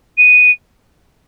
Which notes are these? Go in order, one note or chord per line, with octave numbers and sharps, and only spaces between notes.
D#7